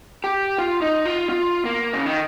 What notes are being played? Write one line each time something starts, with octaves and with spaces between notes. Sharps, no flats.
G4
F4
D#4
F4
F4
A#3
C#3
D#3